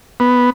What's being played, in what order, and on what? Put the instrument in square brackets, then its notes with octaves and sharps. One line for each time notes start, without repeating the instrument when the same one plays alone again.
[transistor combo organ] B3